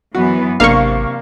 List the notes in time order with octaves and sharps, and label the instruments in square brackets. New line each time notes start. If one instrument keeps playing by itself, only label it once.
[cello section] F#2 E3 B3 [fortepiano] F#4
[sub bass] G#1 [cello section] C3 [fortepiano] A#3 D4 [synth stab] F5 C#6